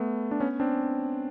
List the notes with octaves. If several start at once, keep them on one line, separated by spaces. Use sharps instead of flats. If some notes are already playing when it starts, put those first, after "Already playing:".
Already playing: A3 B3
D4
B3 C#4
C4 D4